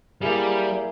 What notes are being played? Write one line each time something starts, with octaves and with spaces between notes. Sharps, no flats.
G3 A#3 E4 G#4